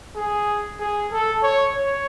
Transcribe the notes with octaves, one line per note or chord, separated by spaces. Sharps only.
G#4
G#4
A4
C#5
C#5